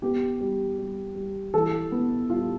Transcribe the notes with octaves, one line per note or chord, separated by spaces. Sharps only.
B3 G4
G3
G3
G3
E3 A4
B3
G3 F4